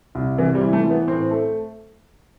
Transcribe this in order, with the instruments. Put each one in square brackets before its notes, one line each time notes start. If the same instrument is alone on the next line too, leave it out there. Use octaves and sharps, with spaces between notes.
[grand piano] C2
[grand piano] C3 [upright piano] E3
[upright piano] G3
[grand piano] E3
[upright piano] A3
[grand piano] E3
[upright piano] B3
[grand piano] A2 [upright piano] C4
[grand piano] A3